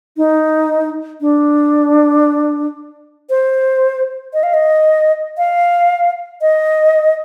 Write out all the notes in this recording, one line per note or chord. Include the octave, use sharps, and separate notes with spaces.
D#4
D4
C5
D#5
F5
D#5
F5
D#5